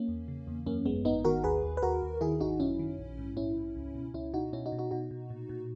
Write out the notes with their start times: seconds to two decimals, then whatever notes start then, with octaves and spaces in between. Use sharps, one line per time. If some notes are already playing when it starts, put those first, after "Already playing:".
Already playing: A#3 C#4
0.08 E2
0.28 C#3
0.47 E2
0.66 F#2 A#3 C#4
0.86 G#1 G#3 B3
1.05 G#1 B3 D#4
1.25 D#3 F#4 A#4
1.44 D#2 G#4 B4
1.63 D#2
1.77 B4
1.82 D#2 F#4 A#4
2.02 D#2
2.21 D#3 E4 G#4
2.41 G#1 D#4 F#4
2.60 F#2 C#4 E4
2.79 D#3
2.99 A#1
3.18 G#2
3.37 A#1 C#4 E4
3.56 G#2
3.75 C#2
3.95 B2
4.14 C#2 C#4 E4
4.34 B2 D#4 F#4
4.53 B2 C#4 E4
4.66 D#4 F#4
4.72 B2
4.79 D#4 F#4
4.91 B2 D#4 F#4
5.11 B2
5.30 A#2
5.49 A#2